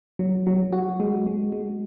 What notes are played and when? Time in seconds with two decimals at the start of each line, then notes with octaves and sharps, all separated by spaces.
0.19 F#3
0.47 F#3
0.73 F#4
1.00 G#3
1.27 G#3
1.52 G#3